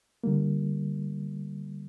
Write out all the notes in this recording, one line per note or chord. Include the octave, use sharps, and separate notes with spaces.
D3 G3 A#3